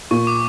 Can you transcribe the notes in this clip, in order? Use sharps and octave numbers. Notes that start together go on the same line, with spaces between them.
A#2 C#6
D6